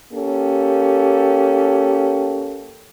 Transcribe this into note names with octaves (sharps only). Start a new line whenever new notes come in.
A#3 C#4 G4 A4